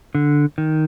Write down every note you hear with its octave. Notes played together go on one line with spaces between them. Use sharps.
D3
D#3